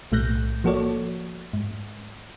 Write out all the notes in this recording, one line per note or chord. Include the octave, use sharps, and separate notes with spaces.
B1 A2 A3 F#6 G6 A#6
F3 A#3 F#4 A4 C#5 D5
G#2